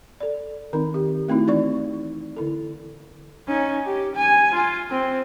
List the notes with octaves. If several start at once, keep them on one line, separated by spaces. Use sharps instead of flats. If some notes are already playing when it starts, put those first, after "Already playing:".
A4 D5
D#3 C4 D#4
G4
A3 C4 D#4 E4 F#4
E3 D#4 D5 C#6
D3 E4 A4
C#4 D#4
G4
G#5
F4
C4